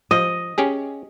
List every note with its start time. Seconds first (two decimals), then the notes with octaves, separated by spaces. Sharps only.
0.11 F3 D#5
0.58 C#4 G4 G#4